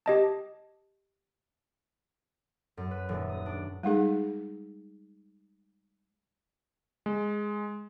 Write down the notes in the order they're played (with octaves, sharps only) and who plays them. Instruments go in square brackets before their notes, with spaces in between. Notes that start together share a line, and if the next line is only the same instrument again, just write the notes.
[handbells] G4 D#5 A5
[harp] F#2
B4
D#1
D#6
D4
[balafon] G3 G#3 D#4 G#4
[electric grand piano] G#3